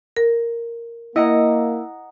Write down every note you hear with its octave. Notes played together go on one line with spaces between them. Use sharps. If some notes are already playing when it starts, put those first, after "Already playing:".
A#4
A#3 E4 D#5 F#5 A#5